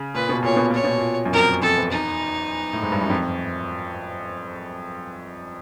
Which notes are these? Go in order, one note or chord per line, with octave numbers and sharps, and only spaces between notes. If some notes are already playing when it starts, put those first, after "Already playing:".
Already playing: C#3
A#2 B4
B2
A#2 C#5
B2
A#2 C#5
B2
A#2
F#2
F2 A#4
F2 A4
E2
D#4
A2
G#2
G2
F#2
F2